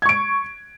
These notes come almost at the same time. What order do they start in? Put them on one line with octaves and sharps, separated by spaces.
G#6 C#6 D7